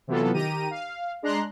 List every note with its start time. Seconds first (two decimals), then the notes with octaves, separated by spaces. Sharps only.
0.07 C3 E3 F#3 B3 F4 A4
0.33 D#3 G4 A#5 D#7
0.71 F5
1.22 G#3 D4 A#5 C6 F#6